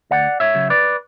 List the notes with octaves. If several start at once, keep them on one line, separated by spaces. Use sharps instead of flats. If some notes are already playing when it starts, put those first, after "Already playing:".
D2 D5 F#5
C#5 E5
C#3 F#3
B4 D5